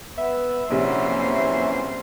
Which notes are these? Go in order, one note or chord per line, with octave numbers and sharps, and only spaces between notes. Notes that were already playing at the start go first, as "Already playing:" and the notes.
B3 B4 E5
A#1 C3 E3 F#3 A#3 C#4 C5